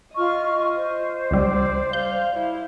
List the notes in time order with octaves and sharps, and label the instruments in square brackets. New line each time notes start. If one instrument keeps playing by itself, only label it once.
[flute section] F4 C#6 F6 [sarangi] D#5
[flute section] C5
[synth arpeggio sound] C#2 G3 [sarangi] D5
[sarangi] F5 [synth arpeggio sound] G6
[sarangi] E4